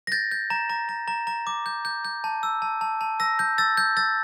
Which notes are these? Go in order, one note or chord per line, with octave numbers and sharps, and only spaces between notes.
A#6
G6 A6
G6
A#5
A#5
A#5
A#5
A#5
D6
G6
G6
G6
A5
E6
A5
A5
A5
E6 A#6
G6
E6 A6
G6
E6 A6